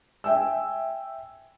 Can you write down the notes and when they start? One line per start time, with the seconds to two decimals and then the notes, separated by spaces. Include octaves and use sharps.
0.24 E5 G5 G#5 E6